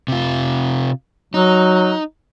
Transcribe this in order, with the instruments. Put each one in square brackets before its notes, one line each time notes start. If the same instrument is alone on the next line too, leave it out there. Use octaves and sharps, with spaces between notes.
[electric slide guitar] C3 F4
[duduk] F#3 [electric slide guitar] D#4